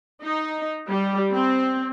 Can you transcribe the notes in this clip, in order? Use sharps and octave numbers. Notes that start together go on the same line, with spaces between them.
D#4
G3
C4